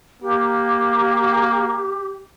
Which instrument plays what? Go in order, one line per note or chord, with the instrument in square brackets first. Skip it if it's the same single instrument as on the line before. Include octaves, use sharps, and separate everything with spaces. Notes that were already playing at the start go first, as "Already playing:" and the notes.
[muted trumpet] A#3 [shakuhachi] G4